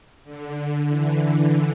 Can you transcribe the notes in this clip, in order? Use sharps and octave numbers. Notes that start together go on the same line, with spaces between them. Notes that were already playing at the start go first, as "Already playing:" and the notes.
D3
E3
E3